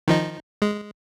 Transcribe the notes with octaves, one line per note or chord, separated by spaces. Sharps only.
D#3 F3 D#4
G#3